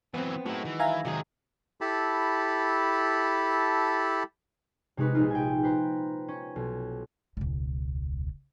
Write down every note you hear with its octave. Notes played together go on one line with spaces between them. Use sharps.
E3 F#3 B3 C4
A2 F#3 G#3 D#4 E4
D#3 E3
E5 F5 G#5 A#5
C3 D#3 F#3 G#3 G#4
E4 G4 A4 A5 B5
C3 G#3 D#4 F#4 B4
A#1 G#3 D#4 F4
G5 G#5
B4 C5 A#5
C#4
B1
E1 C#2